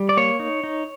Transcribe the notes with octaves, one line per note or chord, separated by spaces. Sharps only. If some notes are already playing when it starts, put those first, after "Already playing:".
Already playing: G3
D5
A#3 C#5
D#4
D#4